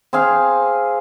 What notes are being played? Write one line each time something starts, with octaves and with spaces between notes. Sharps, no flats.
C4 G#4 F5